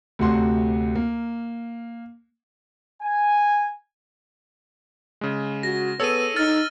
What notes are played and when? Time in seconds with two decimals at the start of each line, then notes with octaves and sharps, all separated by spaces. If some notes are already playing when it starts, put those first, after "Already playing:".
0.19 D2 C3 F#4 C6
0.95 A#3
3.03 G#5
5.21 C#3 G#3
5.63 F#4 A#6
6.00 B3 G#4 A4 C#5 E6 D#7
6.36 D#4 F6 A6